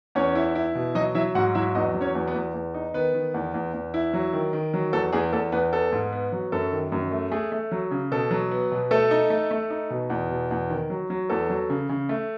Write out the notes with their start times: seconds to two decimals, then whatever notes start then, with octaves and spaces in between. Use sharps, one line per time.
0.15 E2 C#4 C#5
0.35 E4
0.55 E4
0.75 B2
0.95 F#3 D#4 D#5
1.15 F#3 E4 E5
1.35 G#2 F#4 F#5
1.55 F#3 E4 E5
1.75 E2 D#4 D#5
1.95 F#3
2.01 C#4 C#5
2.15 E2
2.27 B3 B4
2.35 E2
2.54 E2
2.74 D#4
2.94 D#3 B3 B4
3.14 D#3
3.34 E2
3.54 E2
3.73 E2
3.94 E4
4.13 F#3
4.33 D#3
4.53 D#3
4.74 F#3
4.93 E2 A4
5.13 E2 G#4
5.33 E2 A4
5.52 E2 B3 B4
5.73 B3 A4
5.92 G#2
6.12 B3
6.32 F#3
6.52 F#2 A4
6.72 D#3
6.92 F#2
7.12 A3
7.31 A3 G#4
7.52 A3
7.72 F#3
7.91 C#3
8.11 B2 A4
8.31 F#3
8.51 B3
8.72 B2
8.91 A3 A4
9.11 D#4
9.30 A3
9.51 A3
9.70 D#4
9.90 B2
10.10 E2
10.30 B2
10.51 E2
10.70 D#3
10.90 F#3
11.10 F#3
11.30 E2 A4
11.50 F#3
11.70 C#3
11.89 C#3
12.09 A3